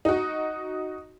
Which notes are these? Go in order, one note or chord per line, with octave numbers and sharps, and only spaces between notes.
D#4 F#4